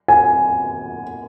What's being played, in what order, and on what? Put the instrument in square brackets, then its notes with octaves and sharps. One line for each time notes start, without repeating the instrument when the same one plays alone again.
[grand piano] G#5